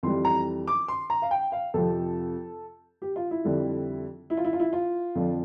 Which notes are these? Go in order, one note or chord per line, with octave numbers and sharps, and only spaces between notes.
F2 E3 G3 C6
A#5
D6
C6
A#5
F5
G5
F5
F2 C3 F3 A4
G4
F4
E4
F2 D3 G3
E4
F4
E4
F4
E4
F4
F2 D3 F3